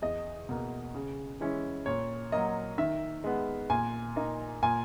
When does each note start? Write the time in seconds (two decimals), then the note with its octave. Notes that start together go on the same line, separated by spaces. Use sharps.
0.02 E2 D#5
0.49 B2 A#3
0.95 C#3
1.40 E3 G#3 C#4 E4
1.86 A#2 C#5
2.32 F#3 A#3 D#5
2.78 D#3 E5
3.24 G#3 B3
3.70 A#2 G#5
4.16 A#3 D#4
4.62 A#2 G#5